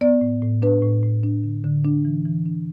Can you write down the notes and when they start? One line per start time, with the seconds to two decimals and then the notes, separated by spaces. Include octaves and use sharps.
0.01 B3 D5
0.21 A2
0.42 A2
0.62 D4 B4
0.83 A2
1.03 A2
1.23 D4
1.44 D3
1.64 D3
1.85 D4
2.05 E3
2.25 E3
2.46 D4